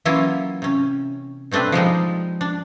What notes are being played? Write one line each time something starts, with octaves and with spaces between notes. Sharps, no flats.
E3 F#3 A#3 C#4 E4 F4
C3 C#4
B2 A3 C4 D4 B4
F3 G3 G#3 D#4
D4